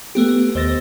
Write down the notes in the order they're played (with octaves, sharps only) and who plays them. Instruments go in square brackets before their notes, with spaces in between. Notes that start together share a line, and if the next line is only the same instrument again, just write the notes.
[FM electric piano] A3 B3 G4
D#2 C5 D#5 E6 A6 A#6